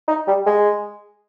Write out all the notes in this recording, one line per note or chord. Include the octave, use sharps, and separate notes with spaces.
D#4
G3
G#3